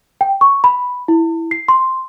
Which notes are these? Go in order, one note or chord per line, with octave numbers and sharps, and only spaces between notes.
G5
C#6
B5
E4
C7
C6